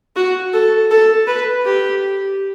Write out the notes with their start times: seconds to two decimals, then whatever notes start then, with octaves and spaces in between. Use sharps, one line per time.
0.16 F#4
0.53 A4
0.91 A4
1.27 B4
1.65 G4